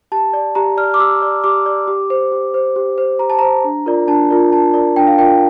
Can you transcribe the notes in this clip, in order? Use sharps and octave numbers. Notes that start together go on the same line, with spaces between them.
G4 A5
D5
G4 A#5
D5 F6
D6
G4 E6
D5
G4 D6
D5
G4
C5
G4
C5
G4
C5
G4 A#5
A5
C5 A#5
D4
F4 A#4 D5
D4 A5
F4 A#4 D5
D4 A5
F4 A#4 D5
D4 G5
F5
F4 A#4 D5 G5